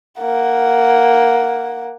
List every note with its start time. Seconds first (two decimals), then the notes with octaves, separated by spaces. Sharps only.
0.20 A#3 F#5